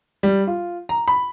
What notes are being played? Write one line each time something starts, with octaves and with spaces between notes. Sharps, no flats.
G3
F4
A#5
B5